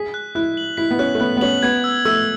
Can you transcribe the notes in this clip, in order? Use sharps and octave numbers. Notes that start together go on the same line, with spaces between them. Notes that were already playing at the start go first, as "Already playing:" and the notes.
Already playing: G#4 B6
F#6
E4 F#6
F#7
E4 B6
B3
C#4 F#6
A3
B3 F#6
B3
C#4 F#7
B3 G#6
E6
A3 E6